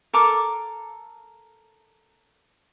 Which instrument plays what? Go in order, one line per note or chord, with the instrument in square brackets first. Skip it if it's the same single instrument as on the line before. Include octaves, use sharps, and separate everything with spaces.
[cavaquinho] A4 A#4 D6